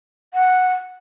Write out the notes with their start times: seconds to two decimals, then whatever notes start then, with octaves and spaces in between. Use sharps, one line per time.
0.34 F#5